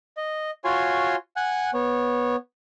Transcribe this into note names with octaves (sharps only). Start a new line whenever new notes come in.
D#5
F4 F#4 C#5 G#5 C6
F#5 G#5 F#6
B3 C#5